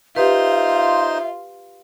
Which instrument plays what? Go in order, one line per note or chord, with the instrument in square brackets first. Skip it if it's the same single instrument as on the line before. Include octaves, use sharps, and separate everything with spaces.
[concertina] D#4 C5 C6 [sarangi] F4 [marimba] G4 B4 [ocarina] E5